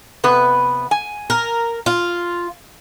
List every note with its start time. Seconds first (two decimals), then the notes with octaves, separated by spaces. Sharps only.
0.24 C3 B3 B4
0.91 G#5
1.30 A#4
1.86 F4